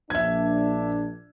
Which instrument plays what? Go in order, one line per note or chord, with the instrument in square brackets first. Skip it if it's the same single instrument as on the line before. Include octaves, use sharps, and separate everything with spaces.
[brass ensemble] A#1 D4 [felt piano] E5 G#6